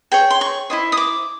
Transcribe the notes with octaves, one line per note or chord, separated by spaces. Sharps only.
G#4 C#5 G5
C6
C#6
E4 G#4 C5 D#5
D#6
D6